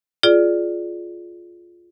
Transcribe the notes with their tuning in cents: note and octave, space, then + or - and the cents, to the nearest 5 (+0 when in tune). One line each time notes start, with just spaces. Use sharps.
F4 +0 G#4 +25 D5 +0